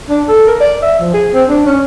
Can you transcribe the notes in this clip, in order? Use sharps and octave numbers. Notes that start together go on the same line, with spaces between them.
D4
A4
A#4
D5
E5
F3
G#4
C4
D4
C#4